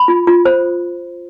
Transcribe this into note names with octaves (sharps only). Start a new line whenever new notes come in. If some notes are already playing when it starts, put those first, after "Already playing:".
Already playing: B5
F4
F4
C5